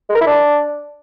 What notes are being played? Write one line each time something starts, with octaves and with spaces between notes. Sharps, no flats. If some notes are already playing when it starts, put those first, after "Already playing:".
G#3
A#4
E4
D4